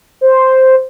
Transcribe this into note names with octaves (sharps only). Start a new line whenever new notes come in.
C5